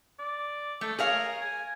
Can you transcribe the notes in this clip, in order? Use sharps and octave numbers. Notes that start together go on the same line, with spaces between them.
D5
A3 A4
G#4 A#4 C#5 F5
G#5